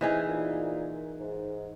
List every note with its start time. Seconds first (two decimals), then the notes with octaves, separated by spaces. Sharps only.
0.01 C3 E3 D#4 G#4
0.28 A#2
1.20 G#2